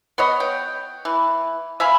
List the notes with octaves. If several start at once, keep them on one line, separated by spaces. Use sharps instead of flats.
B3 C#5 D#5
G5
E3
E5 F5 G#5 B5